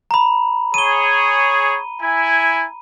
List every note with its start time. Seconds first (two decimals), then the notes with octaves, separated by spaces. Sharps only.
0.11 A#5 B5
0.74 G#4 C#5 D#7 G7
2.01 E4 G#5